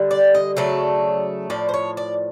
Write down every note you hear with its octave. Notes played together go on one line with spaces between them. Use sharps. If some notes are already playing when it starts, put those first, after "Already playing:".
Already playing: D3 G3
D5
D#5
C#3 F#3 A3 D5
A2 F3 D5
C5
C#5
D5